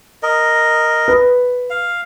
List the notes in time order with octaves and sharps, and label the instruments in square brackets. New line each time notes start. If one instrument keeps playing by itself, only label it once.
[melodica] A#4 D#5
[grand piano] B4
[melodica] F5